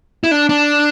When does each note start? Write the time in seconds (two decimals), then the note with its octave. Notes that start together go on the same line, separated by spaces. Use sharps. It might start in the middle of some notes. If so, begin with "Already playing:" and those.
0.24 E4
0.31 D4
0.49 D4